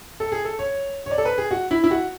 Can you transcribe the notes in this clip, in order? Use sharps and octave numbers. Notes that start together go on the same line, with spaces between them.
A4
G#4
A4
C#5
C#5
D5
A4
B4
G#4
F#4
E4
E4
F#4